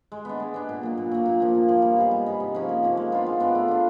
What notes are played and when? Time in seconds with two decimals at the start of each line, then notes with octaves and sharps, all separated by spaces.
0.12 G#3
0.25 B3 D4
0.40 G#3
0.54 B3 D4
0.69 A#2
0.83 F#3 A#3
0.97 A#2
1.11 F#3 A#3
1.26 A#2
1.40 F3 A#3
1.55 A#2
1.69 F3 A#3
1.82 G3
1.97 B3 D#4 G#4
2.11 G3
2.26 B3 D#4 G#4
2.40 C3
2.55 F3 A#3 C#4
2.69 C3
2.83 F3 A#3 C#4
2.97 G#3
3.12 B3 D4 F4
3.26 G#3
3.40 B3 D4 F4
3.55 A3
3.68 D4 F4